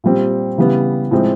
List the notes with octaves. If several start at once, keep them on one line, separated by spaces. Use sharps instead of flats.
A#2 G3 C4
C#3 E3 G3 B3
A2 F3 G#3 C4